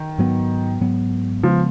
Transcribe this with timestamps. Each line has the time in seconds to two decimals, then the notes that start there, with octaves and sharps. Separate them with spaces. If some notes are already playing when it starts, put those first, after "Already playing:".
Already playing: D#3
0.18 G#2 F#3 B3
0.81 G#2 F#3 B3
1.43 C#3 F3 G#3 B3